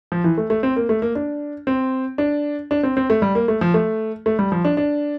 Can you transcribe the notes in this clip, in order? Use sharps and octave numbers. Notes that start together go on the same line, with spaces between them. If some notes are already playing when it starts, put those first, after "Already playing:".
F3
E3
A3
A3
C4
A#3
A3
A#3
D4
C4
D4
D4
C4
C4
A3
G3
A#3
A3
F3
A3
A3
G3
F3
D4
D4